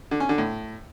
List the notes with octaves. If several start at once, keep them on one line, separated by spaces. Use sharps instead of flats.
D3
C#4
D3
A2